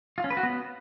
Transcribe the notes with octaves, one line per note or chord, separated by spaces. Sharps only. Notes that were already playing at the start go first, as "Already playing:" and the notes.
F4
C#4
B4
F#4
B3